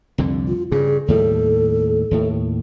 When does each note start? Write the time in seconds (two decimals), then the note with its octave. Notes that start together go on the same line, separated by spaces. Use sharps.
0.18 C2 F2 D3
0.48 F4
0.72 G2 C#3 G#4
1.08 D#2 A2 G3 A4
2.11 D#2 A2